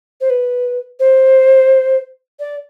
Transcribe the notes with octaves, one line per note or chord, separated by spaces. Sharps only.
C5
B4
C5
D5